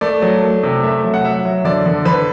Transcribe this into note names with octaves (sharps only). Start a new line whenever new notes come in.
A3 D5
F#3
A3
C3
A3 E5
F#3
F#5
F#3 E5
F#3
D3 D5
D3
D3 B4